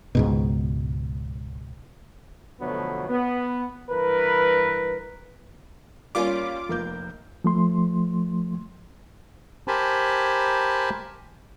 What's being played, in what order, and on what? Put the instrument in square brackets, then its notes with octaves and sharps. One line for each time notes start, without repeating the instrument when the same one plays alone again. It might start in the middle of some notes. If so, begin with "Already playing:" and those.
[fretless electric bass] C#2 G#2 B2
[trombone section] B2 D3 F3 F#3 A3 B3
B3
G2 E3 A#4 B4
[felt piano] G3 A#3 C#4 [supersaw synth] F4 D6
[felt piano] F1 A#3 G6
[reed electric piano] F3 A3 C6
[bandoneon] G4 A#4 C5 G#5 A5 B5